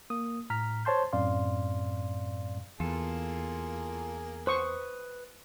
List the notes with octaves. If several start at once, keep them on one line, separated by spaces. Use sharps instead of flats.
A#3 D#6
A2 A#5 F6 B6
C5 C#5 A5 C6 G6
F#2 A2 C4 D5 F5 C6
E2 A#3 F4 G#4 A4
B4 C5 C#6 D#6